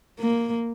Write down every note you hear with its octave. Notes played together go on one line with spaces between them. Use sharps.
A#3